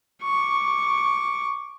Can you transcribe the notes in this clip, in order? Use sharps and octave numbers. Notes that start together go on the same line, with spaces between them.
C#6 D6